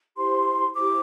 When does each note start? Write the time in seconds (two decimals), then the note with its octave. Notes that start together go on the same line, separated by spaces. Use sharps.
0.17 E4 G4 C5 C6
0.74 E4 G4 C5 D6